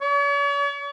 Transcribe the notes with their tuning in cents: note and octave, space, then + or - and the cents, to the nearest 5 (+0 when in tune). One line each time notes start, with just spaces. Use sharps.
C#5 +45